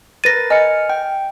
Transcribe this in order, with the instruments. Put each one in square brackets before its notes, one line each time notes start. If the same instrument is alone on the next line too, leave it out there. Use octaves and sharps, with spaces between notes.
[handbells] A#4 B4 A6 [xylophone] A#6 D#7
[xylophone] D#5 [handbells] G#5 F6 C#7
[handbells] G5